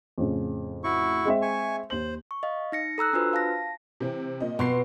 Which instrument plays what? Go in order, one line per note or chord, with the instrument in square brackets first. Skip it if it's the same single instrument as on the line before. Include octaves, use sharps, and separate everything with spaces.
[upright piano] F2 A2 C#3
[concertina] E4 F#4 C#6
[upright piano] G#3 C4 E5
[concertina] G#5 C#6
[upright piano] D#2 F#7 [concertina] C5
[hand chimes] C#6
D#5 F5
D#4 A#6 C#7
A4 A#5 E6 F#6
D4 F4 F#4 B4 C5
F5 A5 A#6
[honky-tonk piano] C3 E3 C4
A#2 D#5
[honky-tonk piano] F2 C6 C7 [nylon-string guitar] B2